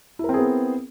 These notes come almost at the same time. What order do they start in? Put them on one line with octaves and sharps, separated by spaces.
E4 A#4 C4 G#4 B3